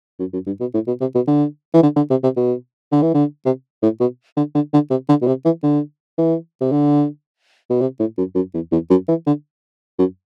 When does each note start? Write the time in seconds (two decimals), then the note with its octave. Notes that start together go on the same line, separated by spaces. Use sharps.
0.19 F#2
0.33 F#2
0.46 G2
0.60 B2
0.74 A2
0.87 B2
1.01 C3
1.15 B2
1.27 D3
1.74 E3
1.83 D3
1.96 D3
2.10 C3
2.24 C3
2.37 B2
2.92 D3
3.02 E3
3.14 D3
3.45 C3
3.83 A2
4.00 B2
4.37 D3
4.55 D3
4.73 D3
4.90 C3
5.09 D3
5.22 B2
5.27 C3
5.45 E3
5.63 D3
6.18 E3
6.61 C3
6.72 D3
7.70 B2
7.81 C3
7.99 A2
8.18 F#2
8.35 F#2
8.54 E2
8.72 E2
8.90 F#2
9.08 E3
9.26 D3
9.99 F#2